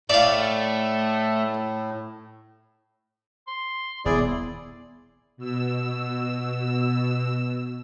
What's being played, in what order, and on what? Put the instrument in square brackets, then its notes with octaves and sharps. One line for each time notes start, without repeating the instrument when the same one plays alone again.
[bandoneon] A2 [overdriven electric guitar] A3 [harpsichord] D5 F5
[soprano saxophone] C6
[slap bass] D#1 [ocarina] B3 [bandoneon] E4 G#4 D5
[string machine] B2 E6